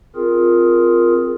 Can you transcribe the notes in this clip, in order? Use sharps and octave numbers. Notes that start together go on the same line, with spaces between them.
C4 F4 G#4 A#4